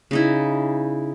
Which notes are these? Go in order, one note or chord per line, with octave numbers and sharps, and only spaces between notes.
C#3 D#4 E4